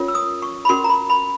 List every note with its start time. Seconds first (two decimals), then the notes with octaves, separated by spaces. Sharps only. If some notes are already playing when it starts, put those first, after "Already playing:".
Already playing: C#4 F4 A#4 C#5
0.08 E6
0.15 D#6
0.42 C#6
0.65 B5
0.69 C#4 F#4 A#4 C6
0.84 A#5
0.89 B5
1.10 B5